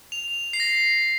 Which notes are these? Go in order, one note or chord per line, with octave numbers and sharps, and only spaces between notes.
F7
C7
A#6